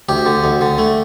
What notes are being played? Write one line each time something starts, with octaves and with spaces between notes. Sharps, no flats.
D2 G4
D3
D2
D3
A3